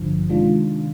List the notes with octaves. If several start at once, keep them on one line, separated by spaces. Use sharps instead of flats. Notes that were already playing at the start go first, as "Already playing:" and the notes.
Already playing: G#1 G2 D3 F3
C3 D#3 G#3 D4 F4